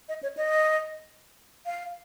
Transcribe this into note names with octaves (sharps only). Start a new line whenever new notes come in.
D#5
C#5
D#5
F5